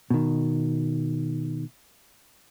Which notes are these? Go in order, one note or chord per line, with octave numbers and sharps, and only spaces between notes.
B2 D#3